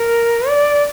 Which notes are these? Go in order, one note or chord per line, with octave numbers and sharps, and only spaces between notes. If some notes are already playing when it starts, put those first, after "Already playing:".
Already playing: A#4
D5